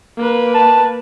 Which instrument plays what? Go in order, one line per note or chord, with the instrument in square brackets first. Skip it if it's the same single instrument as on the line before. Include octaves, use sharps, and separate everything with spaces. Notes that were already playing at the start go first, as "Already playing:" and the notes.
[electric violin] A#3 B4
[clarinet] A5